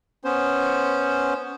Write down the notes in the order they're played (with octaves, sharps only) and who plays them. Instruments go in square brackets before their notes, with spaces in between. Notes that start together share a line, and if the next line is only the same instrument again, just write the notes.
[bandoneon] B3 C#4 C5